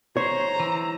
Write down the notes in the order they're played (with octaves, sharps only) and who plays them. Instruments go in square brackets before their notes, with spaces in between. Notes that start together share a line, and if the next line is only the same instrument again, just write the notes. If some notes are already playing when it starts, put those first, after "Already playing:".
[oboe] C5 [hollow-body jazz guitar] C#5 [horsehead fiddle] A#5
[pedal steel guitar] E3